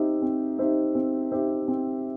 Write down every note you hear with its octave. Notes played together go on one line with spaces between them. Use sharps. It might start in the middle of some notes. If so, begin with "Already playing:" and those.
Already playing: C4 D#4 G4 C5 E5
C4
D#4 G4 C5 E5
C4
D#4 G4 C5 E5
C4